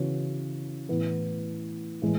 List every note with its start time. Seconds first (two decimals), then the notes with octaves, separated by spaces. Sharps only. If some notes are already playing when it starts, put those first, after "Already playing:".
Already playing: C#3 E3 B3 F#4 C#5
0.89 A2 E3 B3
2.02 A2 E3 G#3